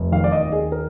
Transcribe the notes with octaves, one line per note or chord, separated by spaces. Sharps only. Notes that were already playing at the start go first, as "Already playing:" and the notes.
Already playing: F1
D#3 F5
D5
D#5
D#2
G#4
A#4